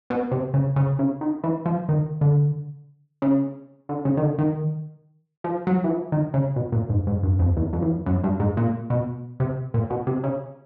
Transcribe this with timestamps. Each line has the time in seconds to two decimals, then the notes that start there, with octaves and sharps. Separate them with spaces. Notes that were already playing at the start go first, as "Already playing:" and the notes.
0.10 B2
0.31 C3
0.54 C#3
0.76 C#3
0.99 C#3
1.21 D#3
1.44 E3
1.66 F3
1.89 D#3
2.21 D3
3.22 C#3
3.89 D3
4.05 C#3
4.17 D#3
4.22 D3
4.38 D#3
5.44 F3
5.67 F#3
5.84 E3
5.90 F3
6.12 D#3
6.34 C#3
6.56 B2
6.72 A#2
6.90 G#2
7.07 G#2
7.23 G2
7.39 F2
7.57 E2
7.73 F2
7.82 E2
7.91 F2
8.06 F#2
8.24 G2
8.40 G#2
8.57 A#2
8.90 B2
9.40 C3
9.74 A#2
9.90 B2
10.07 C3
10.24 C#3